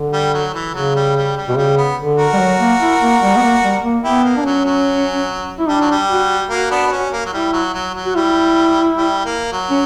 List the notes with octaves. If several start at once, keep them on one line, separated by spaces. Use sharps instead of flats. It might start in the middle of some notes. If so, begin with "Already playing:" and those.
Already playing: D3
G3
F#3
E3
C#3 F#3
G3
G3
G3
B2
C#3 G3
B3
D3
F#4 A#4
G3
F#3
A#3
E4
A#3
G3
B3
A#3
G3
A#3
B3 E4 G4
A#3
D4
F#3 C#4
F#3
E4
G3 D4
F#3
G3
F#4
A#3 F#4
B3 D4
D4
C#4
A#3
F#3
G3 E4
F#3
F#3
F#3
F#4
G3 E4
G3
A#3
F#3
C#4